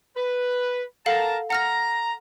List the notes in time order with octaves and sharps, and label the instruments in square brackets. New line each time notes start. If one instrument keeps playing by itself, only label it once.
[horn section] B4
[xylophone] A4 F5 F#5 [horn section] A#4 A5 A#5
[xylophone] F#5 F6 A#6 [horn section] A#5